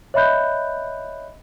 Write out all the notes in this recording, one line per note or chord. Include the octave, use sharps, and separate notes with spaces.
C#5 D#5 E5 B5 F#6 G6